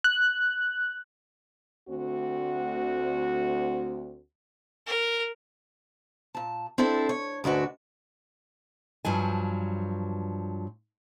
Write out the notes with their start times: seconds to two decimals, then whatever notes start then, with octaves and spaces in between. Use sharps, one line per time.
0.04 F#6
1.89 D2 C4 F#4
4.86 A#4
6.35 A#2 A5
6.78 C4 D4 E4 A4
7.09 C#5
7.44 D2 G#2 D4 F#4 B4
9.05 G2 F3 F#3 G#5